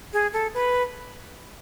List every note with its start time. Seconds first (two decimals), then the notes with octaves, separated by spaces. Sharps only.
0.13 G#4
0.33 A4
0.54 B4